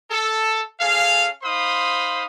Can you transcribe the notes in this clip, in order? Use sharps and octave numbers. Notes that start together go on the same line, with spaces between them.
A4
C#4 G#4 A4 F5
D#4 C5 F5 B5 C6 D#6